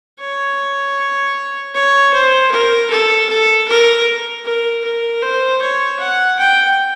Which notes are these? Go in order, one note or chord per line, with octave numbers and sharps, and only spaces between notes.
C#5
C#5
C5
A#4
A4
A4
A#4
A#4
A#4
C5
C#5
F#5
G5